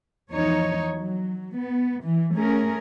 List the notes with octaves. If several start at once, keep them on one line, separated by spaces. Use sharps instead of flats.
E2 F3 D#4 C#5
F#3
B3
E3
A3 C#4 G#4 A#4